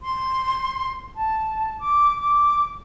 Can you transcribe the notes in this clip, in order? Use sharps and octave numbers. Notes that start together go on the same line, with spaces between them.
C6
A5
D6
D6